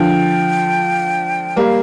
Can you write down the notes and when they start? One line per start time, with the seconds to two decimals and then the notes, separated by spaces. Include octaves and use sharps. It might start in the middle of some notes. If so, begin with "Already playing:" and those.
Already playing: D3 F3 G5
1.56 G3 A#3 F5